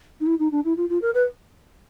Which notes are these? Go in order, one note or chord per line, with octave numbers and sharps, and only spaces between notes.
D#4
E4
D#4
D4
E4
F4
F4
A#4
B4